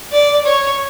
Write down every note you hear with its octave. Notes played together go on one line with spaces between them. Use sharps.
D5
C#5